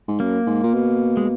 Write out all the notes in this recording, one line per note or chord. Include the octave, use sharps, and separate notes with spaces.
G#2
F#2 A#3
G#2
A#2
B2
G#3